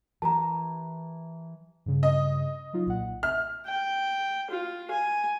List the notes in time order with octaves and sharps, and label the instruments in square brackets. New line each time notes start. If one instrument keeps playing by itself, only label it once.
[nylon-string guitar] E3 G4 A#4 [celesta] A5 A#5
[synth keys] G2 C#3
[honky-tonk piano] D#5
[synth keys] F#3 D#4 F4
B1 A#2 F#5
[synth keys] E5 [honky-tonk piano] F6
[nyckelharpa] G5
F4
G#5